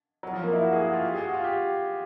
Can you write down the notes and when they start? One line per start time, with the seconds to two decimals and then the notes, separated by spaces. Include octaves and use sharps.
0.23 F#3
0.33 F3
0.44 A#3
0.53 E4
0.63 F#4
0.73 G#4
0.83 F#4
0.93 F4
1.04 G4
1.14 G#4
1.24 F#4
1.34 F4
1.44 G4